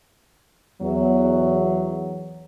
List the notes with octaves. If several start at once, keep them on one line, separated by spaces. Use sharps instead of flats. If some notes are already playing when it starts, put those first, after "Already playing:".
E2 F#3